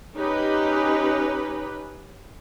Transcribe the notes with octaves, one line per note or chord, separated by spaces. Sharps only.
C#4 D#4 G4 B4